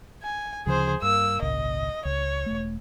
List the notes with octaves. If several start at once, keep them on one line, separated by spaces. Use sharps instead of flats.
G#5
D2 C#3 F3 G#4 C5
G2 A#3 E6
G#1 C#2 A#2 D#5
C#2 C#5
E1 A3